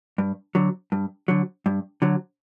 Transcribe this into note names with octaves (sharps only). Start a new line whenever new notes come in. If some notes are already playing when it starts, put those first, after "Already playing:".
G2
D3 F#3
G2
D3 F#3
G2
D3 F#3